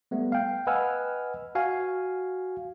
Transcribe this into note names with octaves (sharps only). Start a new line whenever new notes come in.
G3 A3 B3
F5 G5
B4 D#5 F#5 G#5 E6 F6
F#4 F5 G#5